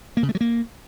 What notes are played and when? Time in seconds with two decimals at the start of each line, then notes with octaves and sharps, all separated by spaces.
0.17 A#3
0.23 C#3
0.29 A3
0.35 F#3
0.41 A#3